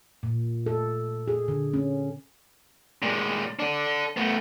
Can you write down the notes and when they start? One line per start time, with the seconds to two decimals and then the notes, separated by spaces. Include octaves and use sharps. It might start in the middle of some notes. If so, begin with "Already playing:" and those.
0.23 A#2
0.66 A4
1.28 G#4
1.48 D3
1.74 C#4
3.02 A#2 G#3
3.59 D4 A4
4.17 A3 B3